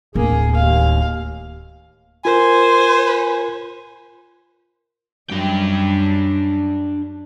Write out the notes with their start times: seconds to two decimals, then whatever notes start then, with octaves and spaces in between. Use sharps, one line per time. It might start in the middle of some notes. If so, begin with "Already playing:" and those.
0.15 D1 A#3 G#4
0.55 D#2 F5
2.25 F4 A#4 C5 G#5
5.30 F#2 G3 D4 G5